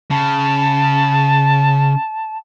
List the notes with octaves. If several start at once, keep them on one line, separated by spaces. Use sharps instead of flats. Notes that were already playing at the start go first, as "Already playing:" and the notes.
C#3 A5